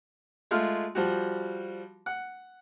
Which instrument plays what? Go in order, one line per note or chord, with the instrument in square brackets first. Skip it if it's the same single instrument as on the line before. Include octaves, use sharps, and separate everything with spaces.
[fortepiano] G#3 A3 F4 F6
F3 G3 F#4
F#5